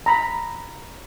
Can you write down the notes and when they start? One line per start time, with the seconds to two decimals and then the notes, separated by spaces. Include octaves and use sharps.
0.06 A#5 B5